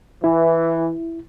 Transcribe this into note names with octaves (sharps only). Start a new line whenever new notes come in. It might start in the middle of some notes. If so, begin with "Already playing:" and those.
E3 E4